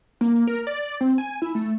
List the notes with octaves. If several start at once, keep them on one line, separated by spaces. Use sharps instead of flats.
A#3
A#4
D5
C4
G#5
E4
A3